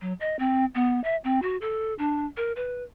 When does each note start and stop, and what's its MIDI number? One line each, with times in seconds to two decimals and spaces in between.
0.01 0.13 54
0.20 0.36 75
0.39 0.65 60
0.75 1.02 59
1.04 1.16 76
1.24 1.41 60
1.42 1.57 66
1.61 1.94 69
1.99 2.25 62
2.37 2.52 70
2.56 2.83 71